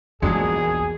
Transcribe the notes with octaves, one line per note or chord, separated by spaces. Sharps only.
A#1 E2 F#3 G#3 D4 G#4